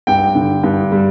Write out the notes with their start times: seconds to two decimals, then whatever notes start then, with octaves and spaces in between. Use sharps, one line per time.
0.07 G2 G5
0.35 D3
0.63 G2
0.92 G3